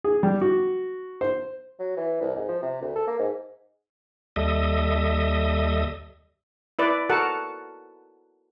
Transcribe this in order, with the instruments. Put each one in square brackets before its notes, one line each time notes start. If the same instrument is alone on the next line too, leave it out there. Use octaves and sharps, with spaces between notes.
[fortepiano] G#4
G3
F#4
C5
[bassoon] F#3
E3
C2
G#2
F3
C3
D2
A4
A#3
G#2
[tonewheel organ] D#2 G3 A4 D#5 E5 D#6
[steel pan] E4 B4 D5
F#4 A4 A#4 F#5 A5